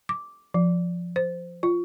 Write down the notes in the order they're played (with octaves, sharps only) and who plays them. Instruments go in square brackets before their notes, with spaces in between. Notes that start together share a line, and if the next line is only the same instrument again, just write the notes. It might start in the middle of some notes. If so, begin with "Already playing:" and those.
[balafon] D6
F3
C5
F4